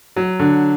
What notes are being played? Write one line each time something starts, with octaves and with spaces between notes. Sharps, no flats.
F#3
D3